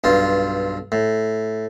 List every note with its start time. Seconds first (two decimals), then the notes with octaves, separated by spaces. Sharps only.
0.04 B1 G2 F4
0.92 A2